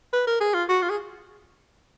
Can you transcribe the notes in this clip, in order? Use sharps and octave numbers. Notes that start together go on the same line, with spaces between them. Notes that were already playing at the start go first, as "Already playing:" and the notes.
B4
A#4
G#4
F4
F#4
F4
G#4